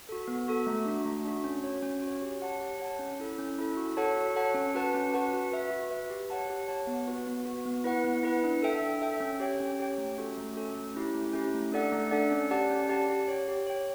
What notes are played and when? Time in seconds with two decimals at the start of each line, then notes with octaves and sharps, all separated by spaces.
0.09 F#4 A4
0.28 B3
0.48 F#4 A4
0.67 A3
0.86 D4 F#4
1.05 A3
1.25 D4 F#4
1.44 C#4
1.64 F#4 C#5
1.83 C#4
2.02 F#4 C#5
2.22 G4
2.42 C#5 F#5 A5
2.61 G4
2.80 C#5 F#5 A5
2.99 C#4
3.20 E4 A4
3.38 C#4
3.58 E4 A4
3.77 F#4
3.97 A4 C#5 F#5 A5
4.16 F#4
4.35 A4 C#5 F#5 A5
4.54 C#4
4.75 F#4 B4 F#5 A5
4.94 C#4
5.13 F#4 B4 F#5 A5
5.33 F#4
5.52 B4 E5
5.71 F#4
5.90 B4 E5
6.10 G4
6.30 C#5 F#5 A5
6.50 G4
6.68 C#5 F#5 A5
6.87 B3
7.07 F#4 B4
7.27 B3
7.45 F#4 B4
7.65 B3
7.84 E4 B4 F#5
8.04 B3
8.23 E4 B4 F#5
8.44 D4
8.62 A4 E5 G5
8.82 D4
9.01 A4 E5 G5
9.20 C#4
9.40 G4 C#5 G5
9.60 C#4
9.79 G4 C#5 G5
9.98 A3
10.18 C#4 F#4 A4
10.37 A3
10.57 C#4 F#4 A4
10.75 A3
10.95 C#4 E4 G4
11.15 A3
11.33 C#4 E4 G4
11.54 A3
11.72 D4 A4 D5 F#5
11.92 A3
12.11 D4 A4 D5 F#5
12.32 C#4
12.51 G4 D5 F#5 A5
12.70 C#4
12.89 G4 D5 F#5 A5
13.08 G4
13.28 C#5 G5
13.48 G4
13.67 C#5 G5